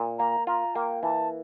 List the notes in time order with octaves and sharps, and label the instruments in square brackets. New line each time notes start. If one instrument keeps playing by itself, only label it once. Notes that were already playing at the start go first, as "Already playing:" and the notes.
Already playing: [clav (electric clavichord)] A#2
[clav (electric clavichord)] A#3 [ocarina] A#5
[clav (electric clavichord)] F4 [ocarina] A#5
[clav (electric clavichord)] A#3 [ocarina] G5
[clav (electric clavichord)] E3 [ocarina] A5